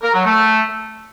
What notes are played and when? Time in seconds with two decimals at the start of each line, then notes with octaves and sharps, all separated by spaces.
0.03 A#4
0.14 F#3
0.25 A3